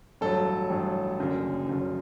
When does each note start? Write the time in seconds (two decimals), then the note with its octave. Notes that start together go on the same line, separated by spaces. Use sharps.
0.21 A1 G2 F#3 A4
0.70 A1 G2 F#3
1.19 F#1 F#2 D3
1.67 F#1 F#2 D3